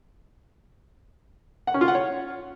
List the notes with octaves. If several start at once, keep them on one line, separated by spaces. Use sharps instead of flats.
F#5
C#4
F4
F#5
C#5